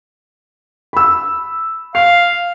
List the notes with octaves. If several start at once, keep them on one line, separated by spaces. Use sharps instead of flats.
B5 E6
F5 C7